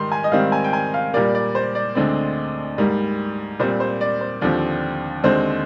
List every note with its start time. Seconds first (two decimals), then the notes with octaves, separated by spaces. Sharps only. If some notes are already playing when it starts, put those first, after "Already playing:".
Already playing: G#2 D#3 G3 C6
0.12 G#5
0.24 D#5
0.32 G#2 D#3 G3 C4 F5
0.52 G#5
0.64 G5
0.73 G#5
0.94 F5
1.14 A#2 G3 A#3 D5
1.35 D5
1.55 C5
1.75 D5
1.95 D2 D3 G#3 C4
2.78 G#2 G3 A#3
3.60 A#2 G3 C4 C5
3.80 C5
4.01 D5
4.21 C5
4.41 D#2 D3 F3 C4 D5
5.24 D#2 D3 G#3 C4 C5